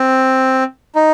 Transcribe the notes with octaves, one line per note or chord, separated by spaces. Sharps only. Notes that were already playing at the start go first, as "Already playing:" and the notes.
Already playing: C4
D#4